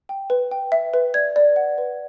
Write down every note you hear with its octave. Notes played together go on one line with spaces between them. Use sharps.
G5
B4
G5
E5
B4
D5 G#6
D5
F#5
B4